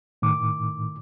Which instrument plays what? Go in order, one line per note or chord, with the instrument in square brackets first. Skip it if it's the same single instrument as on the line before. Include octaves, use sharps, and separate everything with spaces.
[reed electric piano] A2 D#3 D6